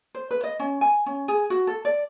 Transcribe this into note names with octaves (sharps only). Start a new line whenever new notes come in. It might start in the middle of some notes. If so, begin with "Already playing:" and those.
C5
B4
D#5
C#4
G#5
C#4
G#4
F#4
A4
D5